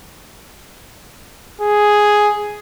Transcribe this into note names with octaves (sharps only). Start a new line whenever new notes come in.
G#4